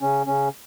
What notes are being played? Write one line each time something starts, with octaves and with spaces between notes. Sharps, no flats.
C#3 C#4
C#3 C#4